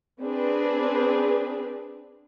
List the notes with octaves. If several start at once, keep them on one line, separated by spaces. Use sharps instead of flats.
C4 D4 G#4 B4